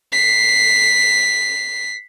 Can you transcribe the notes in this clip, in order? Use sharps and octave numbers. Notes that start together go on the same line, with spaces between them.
B6 C7